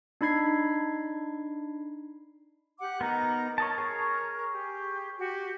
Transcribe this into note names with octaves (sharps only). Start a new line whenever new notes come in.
D4 D#4 B5 G#6 C7
G4 F#5 D6
B3 D#4 A#4 A#5
A#4 C#5 D#5 A5
G#4 C#5
G4
F#4 G4